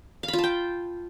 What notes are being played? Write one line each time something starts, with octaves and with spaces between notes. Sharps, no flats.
F5
B5
F4
A5
G5